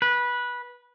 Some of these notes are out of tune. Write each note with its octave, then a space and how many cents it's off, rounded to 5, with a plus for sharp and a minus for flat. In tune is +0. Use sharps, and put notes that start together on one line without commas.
B4 -15